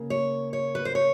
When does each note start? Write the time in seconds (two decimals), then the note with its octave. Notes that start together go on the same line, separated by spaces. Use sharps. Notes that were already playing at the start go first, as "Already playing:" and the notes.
Already playing: C#3 A#3
0.10 C#5
0.53 C#5
0.75 B4
0.85 C5
0.95 C#5